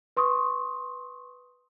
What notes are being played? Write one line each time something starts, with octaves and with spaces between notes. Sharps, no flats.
B4 C6 C#6 D#6